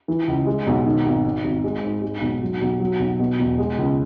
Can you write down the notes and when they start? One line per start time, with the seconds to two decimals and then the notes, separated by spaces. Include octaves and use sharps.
0.08 E3
0.28 C#2
0.46 G#3
0.67 B1
0.86 D#3
1.05 G#1
1.25 D#3
1.44 G#1
1.64 G#3
1.84 G#2
2.02 G#3
2.21 B1
2.42 F#3
2.61 B1
2.80 F#3
2.99 B1
3.20 B2
3.40 E1
3.58 G#3
3.78 C#2